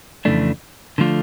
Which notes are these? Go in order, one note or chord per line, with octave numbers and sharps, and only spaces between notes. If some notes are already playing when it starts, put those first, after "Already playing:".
F2 C#3 E3 A3 D4
D3 F3 A3 D4 F4